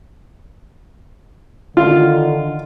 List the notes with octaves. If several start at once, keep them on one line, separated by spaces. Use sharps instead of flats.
D3 D#3 F4